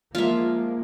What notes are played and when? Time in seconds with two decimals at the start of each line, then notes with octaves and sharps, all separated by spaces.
0.15 F3 G#3 A#3 F4 E5